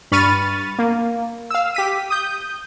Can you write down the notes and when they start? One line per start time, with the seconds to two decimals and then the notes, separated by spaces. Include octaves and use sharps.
0.12 G2 B5 C#6 F6 A6 D#7
0.79 A#3
1.51 F5 E6
1.75 G4 B6 D#7
2.10 D#6 G6